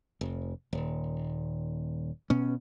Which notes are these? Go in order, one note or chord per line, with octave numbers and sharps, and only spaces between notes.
F1
D#1
B2 B3 C#4